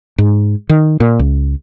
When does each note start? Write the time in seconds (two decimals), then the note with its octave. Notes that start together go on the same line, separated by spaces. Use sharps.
0.18 G#2
0.69 D#3
1.00 A#2
1.19 C#2